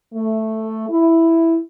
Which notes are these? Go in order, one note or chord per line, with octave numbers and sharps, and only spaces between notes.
A3
E4